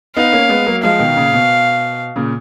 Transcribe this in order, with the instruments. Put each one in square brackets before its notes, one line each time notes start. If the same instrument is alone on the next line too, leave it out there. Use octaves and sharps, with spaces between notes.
[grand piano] B3 D#4 [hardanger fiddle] F5
[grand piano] A#3 C#4
G#3 B3
F#3 A#3
[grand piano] F3 G#3 [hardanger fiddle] F5
[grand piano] B2 D#3
A#2 C#3
B2
A#2 C#3